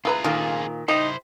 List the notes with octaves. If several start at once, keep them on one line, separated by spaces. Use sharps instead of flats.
E4 F4 G#4 B4 A#5
A#2 D3 D#3 F3
D#4 E4 G4 C5